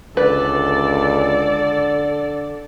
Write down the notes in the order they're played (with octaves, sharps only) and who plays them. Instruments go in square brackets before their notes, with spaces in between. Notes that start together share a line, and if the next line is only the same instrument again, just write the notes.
[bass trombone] C#2 [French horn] D3 [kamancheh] A4 D5 [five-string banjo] B4